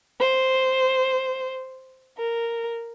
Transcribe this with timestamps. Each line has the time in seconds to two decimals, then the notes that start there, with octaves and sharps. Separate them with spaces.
0.20 C5
2.18 A#4